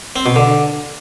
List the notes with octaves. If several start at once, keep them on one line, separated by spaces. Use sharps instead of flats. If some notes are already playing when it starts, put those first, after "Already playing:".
C4
B2
D3